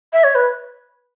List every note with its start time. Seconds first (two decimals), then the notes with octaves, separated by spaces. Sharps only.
0.13 E5
0.24 C#5
0.35 B4